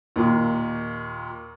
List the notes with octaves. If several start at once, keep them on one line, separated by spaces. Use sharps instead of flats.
D#2 A#2